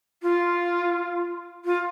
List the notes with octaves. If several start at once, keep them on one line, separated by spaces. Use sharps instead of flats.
F4
F4